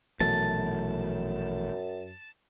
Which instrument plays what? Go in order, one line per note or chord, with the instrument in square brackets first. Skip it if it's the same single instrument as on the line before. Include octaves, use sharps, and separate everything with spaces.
[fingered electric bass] A#1 B2 F#3 [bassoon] F#2 [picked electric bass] E3 A3 [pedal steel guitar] A5